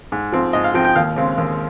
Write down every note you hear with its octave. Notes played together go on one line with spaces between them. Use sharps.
G#2
F3 C4
G#2 D#5
F5
F3 C4 G5
G5
D#2 F5
C#3 G#3 C4
D#2